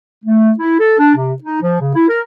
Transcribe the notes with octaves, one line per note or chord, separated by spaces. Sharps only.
A3
E4
A4
D4
C3
D#4
F3
C#3
E4
A#4